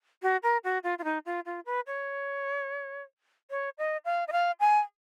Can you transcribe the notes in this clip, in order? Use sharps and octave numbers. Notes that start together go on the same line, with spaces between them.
F#4
A#4
F#4
F4
F4
D#4
F4
F4
B4
C#5
C#5
D#5
F5
D#5
F5
G#5